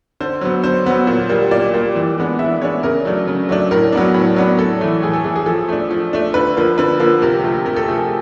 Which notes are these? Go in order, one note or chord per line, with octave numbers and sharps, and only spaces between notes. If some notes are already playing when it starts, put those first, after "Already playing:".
D3 C5
F#3 B3
D3 C5
F#3 B3
A#2
G3 A#3
A#2 D5
G3 A#3
E3
G#3 B3 D4
E3 E5
G#3 B3 D4 C#5
C#3 A#4
F#3 A3 D4
C#3
F#3 A3 D4
A2 A#4
F#3 B3 D4
A2
F#3 B3 D4
A2 A4
E3 A3
A2 G#4
A4
E3 A3 G#4
G#4
F3 A4
A3 D4
F3
A3 D4
D3 B4
F3 A#3
D3 B4
F3 A#3
C3 A#4
F3 A3
C3 A#4
A4
F3 A3 G#4